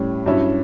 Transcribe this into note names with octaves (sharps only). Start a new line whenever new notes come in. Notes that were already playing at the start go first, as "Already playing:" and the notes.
Already playing: A2 G3 C#4
G2 F#3 C#4 E4